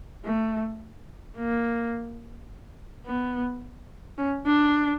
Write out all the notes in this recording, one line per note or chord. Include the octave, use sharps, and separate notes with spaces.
A3
A#3
B3
C#4
D4